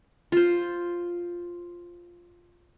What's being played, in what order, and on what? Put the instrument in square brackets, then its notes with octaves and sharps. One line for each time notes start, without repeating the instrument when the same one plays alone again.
[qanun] F4 C5